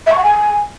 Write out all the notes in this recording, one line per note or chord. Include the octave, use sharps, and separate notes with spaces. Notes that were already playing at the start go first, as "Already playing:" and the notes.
E5
C#6
F#5
G#5